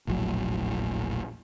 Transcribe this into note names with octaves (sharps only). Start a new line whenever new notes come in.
E1 A#1 A2 F#3